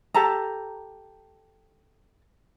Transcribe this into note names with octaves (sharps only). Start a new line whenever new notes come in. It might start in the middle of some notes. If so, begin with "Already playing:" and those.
G4 A4 A5 A#5